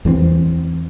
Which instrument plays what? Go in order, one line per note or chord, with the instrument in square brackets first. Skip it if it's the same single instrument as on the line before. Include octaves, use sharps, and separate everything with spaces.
[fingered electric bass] E2 E3 G3 C4